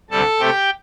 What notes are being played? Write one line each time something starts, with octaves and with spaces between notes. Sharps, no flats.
D2 C3 G3 A4 A5
C3 A3 C4 G4 G5